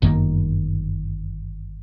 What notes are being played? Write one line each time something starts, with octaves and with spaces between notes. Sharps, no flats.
G1 F#2 D#3 A#3